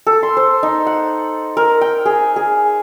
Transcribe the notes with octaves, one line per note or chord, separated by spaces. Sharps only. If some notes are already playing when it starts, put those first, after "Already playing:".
A4
C6
C5
D#4
F#5
A#4
G5
G#4
G#4